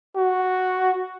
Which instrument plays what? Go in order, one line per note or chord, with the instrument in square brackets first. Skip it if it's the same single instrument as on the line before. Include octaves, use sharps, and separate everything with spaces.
[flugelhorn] F#4